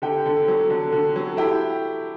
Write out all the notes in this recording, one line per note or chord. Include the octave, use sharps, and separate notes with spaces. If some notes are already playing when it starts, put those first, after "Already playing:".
D3 G4 G5
D3
F#3
D3
D3
F#3
E4 G4 G5